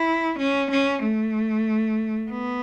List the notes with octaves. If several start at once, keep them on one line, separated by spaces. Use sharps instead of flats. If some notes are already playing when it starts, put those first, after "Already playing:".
Already playing: E4
C#4
C#4
A3
B3